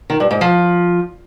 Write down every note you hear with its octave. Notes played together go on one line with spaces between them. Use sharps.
D#3
G2
G#2
F3